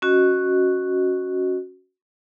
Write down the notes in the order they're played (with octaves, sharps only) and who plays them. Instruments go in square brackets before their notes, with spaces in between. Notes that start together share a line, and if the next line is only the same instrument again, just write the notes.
[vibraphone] C#4 F#4 D#5